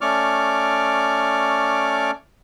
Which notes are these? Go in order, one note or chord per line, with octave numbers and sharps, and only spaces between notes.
A3 C#4 D5 C#6 D6 F6